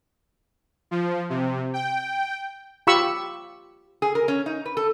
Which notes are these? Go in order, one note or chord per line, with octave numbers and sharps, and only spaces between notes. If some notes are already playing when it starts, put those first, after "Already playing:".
F3
C3
G5
F4 G4 B5 C#6 E6
G#4
A#4
C#4
D#4
B4
A4